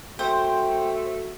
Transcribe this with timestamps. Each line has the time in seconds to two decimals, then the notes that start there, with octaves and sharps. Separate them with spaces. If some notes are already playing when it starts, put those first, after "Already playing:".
0.19 A3 F#4 C5 G5